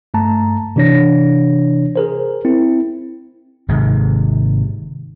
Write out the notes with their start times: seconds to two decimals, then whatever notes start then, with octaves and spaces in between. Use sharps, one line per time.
0.14 G2 A3 A5 A#5
0.76 C3 E3 D4 C#5 A#6
1.96 G#4 A#4 C5
2.45 C4 E4
3.68 G#1 G#2 C3